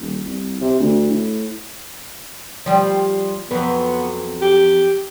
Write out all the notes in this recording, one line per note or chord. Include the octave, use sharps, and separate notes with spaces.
D#1
C2
C3
D2
A2
F3 G3
F2 F#3 B3 B4
G4